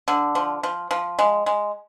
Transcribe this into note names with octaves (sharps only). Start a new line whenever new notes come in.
D3
F3
F3
F3
G#3
G#3